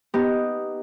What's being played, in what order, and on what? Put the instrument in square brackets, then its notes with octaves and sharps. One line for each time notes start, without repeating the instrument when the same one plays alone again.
[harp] B3 D#4 G4